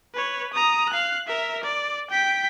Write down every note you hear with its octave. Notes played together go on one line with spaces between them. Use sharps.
B4 C#5
A#5 D#6
F5 F#6
A#4 E5
D5
G5 B6